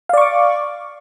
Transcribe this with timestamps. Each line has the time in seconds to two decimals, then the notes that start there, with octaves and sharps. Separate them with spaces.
0.09 F5
0.13 D5
0.17 C#6
0.22 D6